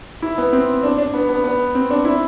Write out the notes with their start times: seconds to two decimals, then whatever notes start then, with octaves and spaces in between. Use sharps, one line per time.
0.22 E4
0.38 B3
0.53 C4
0.83 D4
0.98 D4
1.14 B3
1.29 B3
1.44 B3
1.75 C4
1.91 D4
2.05 E4